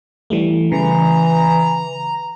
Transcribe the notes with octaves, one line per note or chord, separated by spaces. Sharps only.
E3 G3 A3
C#3 E3 A#5